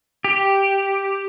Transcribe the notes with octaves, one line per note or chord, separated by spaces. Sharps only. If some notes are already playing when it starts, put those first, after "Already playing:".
G4